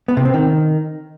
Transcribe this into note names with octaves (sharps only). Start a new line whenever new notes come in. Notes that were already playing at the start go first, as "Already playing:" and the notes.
B3
C3
C4
D#3